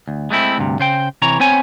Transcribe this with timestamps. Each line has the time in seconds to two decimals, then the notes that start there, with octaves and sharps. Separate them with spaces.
0.08 D2
0.31 G#3 A3 C4 E4
0.58 D2 G2 C3
0.80 C#3 C5 G5
1.22 C3 E3 C#5 A#5
1.40 B3 C4 C5 C#5 G#5